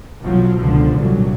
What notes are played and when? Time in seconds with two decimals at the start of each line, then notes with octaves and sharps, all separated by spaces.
0.22 B1 B2 F3 F#3
0.59 C#2 B2 D3 F3
0.95 C2 A#2 F#3